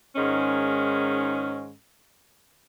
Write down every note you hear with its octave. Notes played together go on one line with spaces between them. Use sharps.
G#2 D#3 G#3 C#4